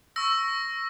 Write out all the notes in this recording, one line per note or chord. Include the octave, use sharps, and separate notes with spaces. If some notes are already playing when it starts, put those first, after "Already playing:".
C#6 E6 A#6